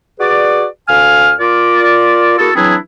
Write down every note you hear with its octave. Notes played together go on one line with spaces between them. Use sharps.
F#4 G#4 B4 D5
D2 F5 G#5 F6
F4 A#4 D5
A#3 E4 F#4 G#4 A4
E3 F#3 C4 D4 E4 G#4